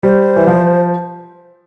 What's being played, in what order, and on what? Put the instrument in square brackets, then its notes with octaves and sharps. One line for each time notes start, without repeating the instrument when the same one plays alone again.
[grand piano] G3 [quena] C5
[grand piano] E3
F3